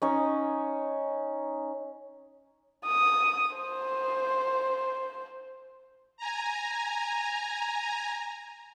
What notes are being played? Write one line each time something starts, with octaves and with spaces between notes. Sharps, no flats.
C#4 D#4 C#5
D#6
C5
G#5 A#5